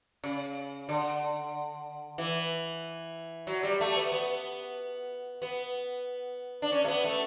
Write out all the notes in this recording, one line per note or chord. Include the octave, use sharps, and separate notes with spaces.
C#3
D3
E3
F#3
G3
A3
B3
B3
B3
D4
C#4
A3
B3
A3